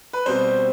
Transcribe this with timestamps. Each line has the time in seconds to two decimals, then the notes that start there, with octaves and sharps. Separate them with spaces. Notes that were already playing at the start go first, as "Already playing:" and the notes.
0.13 B4
0.26 B2 G3 C4 C5